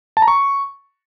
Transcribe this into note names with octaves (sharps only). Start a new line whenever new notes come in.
A5
A#5
C#6